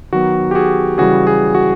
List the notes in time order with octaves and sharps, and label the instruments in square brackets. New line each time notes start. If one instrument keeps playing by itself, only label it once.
[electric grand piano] D#3 F#3 B3 F#4
G4
F#4 G#4
C#3 E3 G3 F#4 G#4
F#4 G#4
F#4